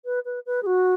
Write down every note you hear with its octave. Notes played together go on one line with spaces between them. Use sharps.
B4
B4
B4
G#4
F#4